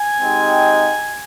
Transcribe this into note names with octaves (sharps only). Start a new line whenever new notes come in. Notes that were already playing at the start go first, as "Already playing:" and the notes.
Already playing: G#5
G#3 C4 D#4 G4